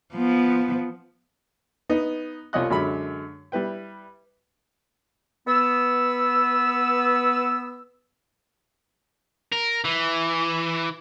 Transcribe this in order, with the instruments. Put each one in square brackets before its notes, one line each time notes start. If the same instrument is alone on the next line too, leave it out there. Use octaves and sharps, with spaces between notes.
[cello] F3 B3
[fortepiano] B3 D#4
C2 F3 C#5 D#5 F#6
F#2 D3 F#3 G#3 B5
G3 E4 B4 G5
[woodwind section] B3 E6
[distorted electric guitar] A#4
E3